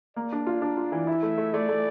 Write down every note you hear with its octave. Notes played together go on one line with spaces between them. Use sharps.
A#3 D5
D4
F4
D4
F4
E3
E4 E5
A3
A3
A3 D5
A3